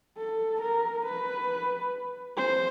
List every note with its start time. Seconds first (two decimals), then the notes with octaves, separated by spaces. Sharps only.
0.17 A4
0.61 A#4
1.05 B4
2.37 C5